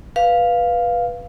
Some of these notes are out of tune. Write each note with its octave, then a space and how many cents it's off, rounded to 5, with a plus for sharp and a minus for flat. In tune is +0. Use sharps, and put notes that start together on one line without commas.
B4 -10 F5 +0